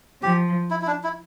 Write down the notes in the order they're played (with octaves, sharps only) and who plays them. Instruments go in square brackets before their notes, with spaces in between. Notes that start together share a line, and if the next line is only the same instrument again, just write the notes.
[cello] F3 [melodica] G4
[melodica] E4
E4
D4
E4